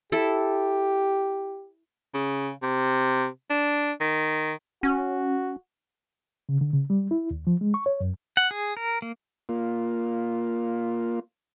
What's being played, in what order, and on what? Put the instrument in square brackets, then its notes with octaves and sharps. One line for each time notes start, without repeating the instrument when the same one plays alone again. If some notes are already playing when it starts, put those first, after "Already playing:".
[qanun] E4 A4 [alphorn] G4
[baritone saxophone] C#3
C3
D4
D#3
[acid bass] C#4 [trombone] F#4
[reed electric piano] C#3
D3
C#3
G3
E4
D#2
F3
G#3
C#6
C#5
F#2
[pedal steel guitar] F#5
G#4
A#4
A#3
[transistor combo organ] A#3 F4